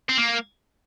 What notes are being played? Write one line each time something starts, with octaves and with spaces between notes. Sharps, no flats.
C4
A#3